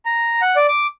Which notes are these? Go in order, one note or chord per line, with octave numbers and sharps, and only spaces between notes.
A#5
F#5
D5
D6